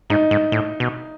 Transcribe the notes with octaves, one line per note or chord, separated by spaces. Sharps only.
G#2 D#4
G#2
A2
B2